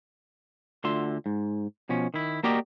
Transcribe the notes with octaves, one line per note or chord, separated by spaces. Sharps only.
D2 D3 F4 E5 C6
G#2
B2 F3 C#4
D#3 E4
A#3 F#4 G4 A#4 D5 D#5